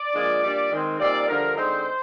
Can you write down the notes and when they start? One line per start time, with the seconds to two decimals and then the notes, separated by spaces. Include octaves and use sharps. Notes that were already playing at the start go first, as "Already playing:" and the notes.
Already playing: D5
0.14 A#2 F3 G#3 D4
0.43 A#2 G3 D4
0.70 D#3 G#3 C4
0.99 A#2 G3 C4 D#4 D5
1.27 G2 D3 F3 A#4
1.56 D3 G#3 C4 D#4 C5